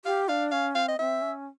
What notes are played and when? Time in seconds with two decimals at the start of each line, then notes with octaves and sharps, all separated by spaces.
0.05 G4 F5
0.29 D4 F5
0.52 C#4 F5
0.75 C4 F5
0.88 D#5
0.99 C4 E5
1.21 C#4